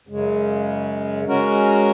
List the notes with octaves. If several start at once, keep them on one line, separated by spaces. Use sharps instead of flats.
F#2 C#3 G#3
G#3 C#4 F#4 A#4